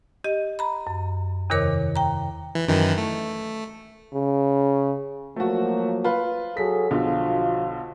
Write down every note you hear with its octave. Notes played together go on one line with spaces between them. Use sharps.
G4 D#5
A#5 B5
F#2
E2 C3 D#3 A#4 C#5 D6
G5 A#5
E3
F#2 D#3 E3
A3
C#3
F3 F#3 A3 A#3 F#4
F4 B4
F#3 G#4 A4 B6
B1 D3 F3 F4 F#4